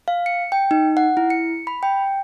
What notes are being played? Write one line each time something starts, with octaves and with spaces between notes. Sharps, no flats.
F5
C#7
G5
D#4
F#5
E4
C#7
B5
G5